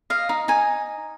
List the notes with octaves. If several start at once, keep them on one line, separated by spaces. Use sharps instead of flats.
D#5 F5
D#4
D#4 G#5